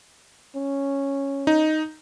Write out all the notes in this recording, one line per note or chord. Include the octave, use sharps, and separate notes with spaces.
C#4
D#4